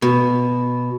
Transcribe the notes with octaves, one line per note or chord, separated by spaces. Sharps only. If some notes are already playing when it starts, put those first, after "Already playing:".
B2